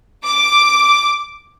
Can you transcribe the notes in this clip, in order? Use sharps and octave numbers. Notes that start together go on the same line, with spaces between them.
D6